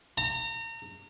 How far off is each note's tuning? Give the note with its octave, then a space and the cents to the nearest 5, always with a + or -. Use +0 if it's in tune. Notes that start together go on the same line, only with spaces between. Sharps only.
A#5 -35